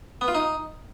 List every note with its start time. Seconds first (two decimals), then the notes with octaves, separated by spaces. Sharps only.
0.21 B3
0.28 F4
0.35 D#4